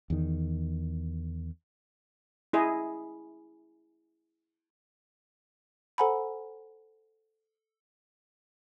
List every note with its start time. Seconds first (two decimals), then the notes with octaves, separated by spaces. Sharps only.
0.10 E2 D#3
2.53 E4 G#4 D#5
5.98 A4 C5 F#5 G#5 A#5 B5